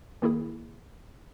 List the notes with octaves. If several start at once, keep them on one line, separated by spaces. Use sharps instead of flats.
D#3 A#3 E4 G#4